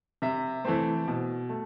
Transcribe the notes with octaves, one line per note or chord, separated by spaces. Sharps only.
C3 E5
E3 A3 C4
B2
A3